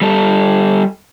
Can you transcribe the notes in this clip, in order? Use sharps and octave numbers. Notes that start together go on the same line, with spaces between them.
G3 A4